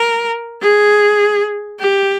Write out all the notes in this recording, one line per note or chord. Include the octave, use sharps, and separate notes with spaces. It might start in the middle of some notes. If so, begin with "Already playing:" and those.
Already playing: A#4
G#4
G4